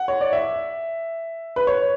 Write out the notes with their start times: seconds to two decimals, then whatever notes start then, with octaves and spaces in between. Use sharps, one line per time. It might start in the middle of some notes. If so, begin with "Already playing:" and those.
Already playing: F#5
0.08 C#5
0.21 D5
0.33 E5
1.56 B4
1.67 C#5